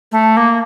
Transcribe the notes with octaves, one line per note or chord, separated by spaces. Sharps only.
A3
A#3